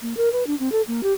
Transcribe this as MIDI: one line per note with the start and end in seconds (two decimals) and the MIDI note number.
0.02 0.17 58
0.17 0.32 70
0.32 0.46 71
0.47 0.55 62
0.59 0.69 60
0.72 0.82 69
0.88 1.01 58
1.03 1.13 67